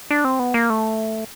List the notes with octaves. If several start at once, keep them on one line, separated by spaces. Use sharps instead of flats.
D4
C4
B3
A#3
A3